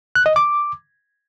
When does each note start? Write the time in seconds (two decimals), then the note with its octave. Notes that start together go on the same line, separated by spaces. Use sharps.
0.15 F#6
0.26 D#5
0.36 D6